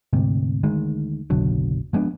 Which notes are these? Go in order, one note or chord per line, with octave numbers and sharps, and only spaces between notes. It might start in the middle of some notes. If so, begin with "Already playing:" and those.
D2 G#2 C3
D2 D#3 G#3
F#1 B1 D3 F#3
F3 G#3 B3 D4